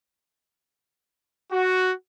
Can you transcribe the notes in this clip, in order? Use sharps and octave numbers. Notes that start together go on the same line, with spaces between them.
F#4